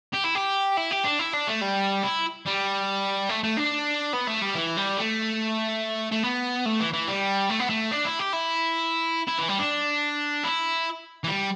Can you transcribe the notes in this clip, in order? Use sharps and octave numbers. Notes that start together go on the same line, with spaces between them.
G4
E4
G4
E4
G4
D4
E4
D4
A3
G3
E4
G3
A3
A3
D4
B3
A3
G3
E3
G3
A3
A3
B3
A3
E3
E3
G3
A3
B3
A3
D4
E4
G4
E4
E4
E3
G3
D4
E4
E3
G3